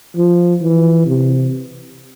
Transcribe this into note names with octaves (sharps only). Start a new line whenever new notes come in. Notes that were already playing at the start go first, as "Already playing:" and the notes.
F3
E3
C3